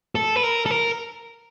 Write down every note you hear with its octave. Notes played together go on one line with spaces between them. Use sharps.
A4
B4
A#4
A4
A#4